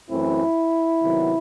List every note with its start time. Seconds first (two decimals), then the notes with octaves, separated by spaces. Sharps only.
0.09 F#2 E3 A3 C4 E4
1.01 C3 D#3 F#3 B3